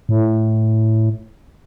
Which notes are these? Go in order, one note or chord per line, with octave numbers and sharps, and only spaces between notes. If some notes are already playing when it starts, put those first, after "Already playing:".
A2